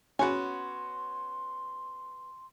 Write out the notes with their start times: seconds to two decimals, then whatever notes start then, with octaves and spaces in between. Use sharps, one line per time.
0.19 B3 C#4 F#4 G#5 C6